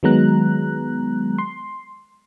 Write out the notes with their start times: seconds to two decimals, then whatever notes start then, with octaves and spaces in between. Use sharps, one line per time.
0.03 D#3 F#3 G#3 B3 A#5 F#6
1.38 C6